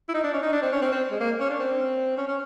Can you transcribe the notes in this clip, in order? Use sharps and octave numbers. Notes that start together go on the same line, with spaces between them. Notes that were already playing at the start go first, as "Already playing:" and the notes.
E4
D#4
D4
C#4
D#4
D4
C4
C#4
C4
C4
G#3
A#3
C#4
D4
C4
C#4
C#4